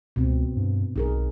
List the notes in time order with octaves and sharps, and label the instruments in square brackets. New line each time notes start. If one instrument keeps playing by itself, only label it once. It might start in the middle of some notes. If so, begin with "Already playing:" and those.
[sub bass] C#2 [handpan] B2 C4
[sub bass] G2
[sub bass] B1 [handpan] D#4 G#4 A#4